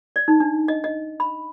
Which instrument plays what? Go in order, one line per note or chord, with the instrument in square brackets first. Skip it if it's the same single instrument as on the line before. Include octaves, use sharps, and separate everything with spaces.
[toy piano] D5
D#4
D4
D#5
D#5
B5